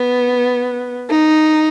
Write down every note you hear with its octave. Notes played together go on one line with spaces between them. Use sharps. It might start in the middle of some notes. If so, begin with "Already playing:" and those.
Already playing: B3
D#4